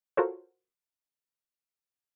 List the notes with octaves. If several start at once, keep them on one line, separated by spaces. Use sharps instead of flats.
F4 F#4 A4 A#4 C5 C#5